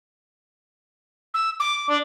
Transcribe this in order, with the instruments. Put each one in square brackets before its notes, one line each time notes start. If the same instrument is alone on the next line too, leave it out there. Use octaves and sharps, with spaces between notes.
[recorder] E6
D6
[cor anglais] D4